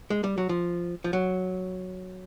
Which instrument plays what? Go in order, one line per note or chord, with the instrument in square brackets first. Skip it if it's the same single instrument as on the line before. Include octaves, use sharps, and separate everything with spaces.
[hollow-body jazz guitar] G#3
G3
F#3
F3
F3
F#3